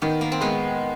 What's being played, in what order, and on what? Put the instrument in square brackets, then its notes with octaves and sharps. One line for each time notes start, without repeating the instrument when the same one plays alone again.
[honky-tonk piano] D#3 [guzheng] B3
[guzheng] A#3
C4
[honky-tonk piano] G#3 [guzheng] B3